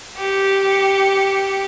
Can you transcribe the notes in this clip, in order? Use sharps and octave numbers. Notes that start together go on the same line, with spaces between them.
G4 C#7